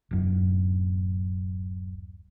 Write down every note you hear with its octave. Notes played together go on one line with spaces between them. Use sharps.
D1 F#2